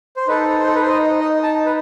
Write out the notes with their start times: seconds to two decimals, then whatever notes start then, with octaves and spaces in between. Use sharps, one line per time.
0.17 C5
0.27 D#4 A4 B4
0.59 C5
0.67 A4
0.75 B4
0.82 C5
0.89 D#5
1.21 D#5
1.43 A5
1.66 B4